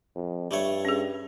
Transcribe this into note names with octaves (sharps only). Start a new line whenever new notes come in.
F2
G2 G3 A3 C#5
C#4 G#4